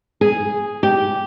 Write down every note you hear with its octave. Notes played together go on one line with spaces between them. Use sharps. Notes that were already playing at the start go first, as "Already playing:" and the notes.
G#4
G4